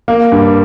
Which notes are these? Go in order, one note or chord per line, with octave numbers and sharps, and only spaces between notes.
A#3
G2